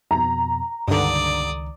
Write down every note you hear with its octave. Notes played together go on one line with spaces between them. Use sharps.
F2 B2 A#5
C#2 G2 D3 D#3 D5 D#6